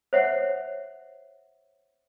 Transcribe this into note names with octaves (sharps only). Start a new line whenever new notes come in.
C5 C#5 E5 F#5